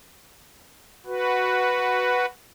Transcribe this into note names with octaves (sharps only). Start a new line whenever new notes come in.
F#4 B4